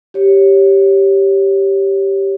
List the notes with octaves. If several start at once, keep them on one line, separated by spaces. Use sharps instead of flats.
G4 C#5